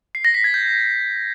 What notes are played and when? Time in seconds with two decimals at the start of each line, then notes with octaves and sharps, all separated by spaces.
0.15 C7
0.25 A#6
0.34 B6
0.44 G#6
0.54 G6